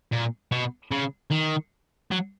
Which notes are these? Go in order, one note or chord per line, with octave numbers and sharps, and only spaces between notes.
A#2
B2
C#3
D#3
F#3